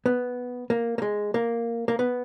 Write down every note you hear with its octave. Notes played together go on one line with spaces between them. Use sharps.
B3
A#3
A#3
G#3
A#3
A#3
B3